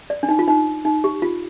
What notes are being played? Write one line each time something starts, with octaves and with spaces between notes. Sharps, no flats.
D5
D4
D#4
F4
D#4
D#4
G4
F4